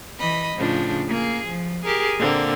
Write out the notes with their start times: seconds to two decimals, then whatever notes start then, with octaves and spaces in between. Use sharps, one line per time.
0.19 E3 D#5 B5
0.57 A2 C#3 F3 D4
1.08 A#3 G#4
1.48 F3
1.85 G4 G#4 A#4
2.19 A#2 D3 A#3 C4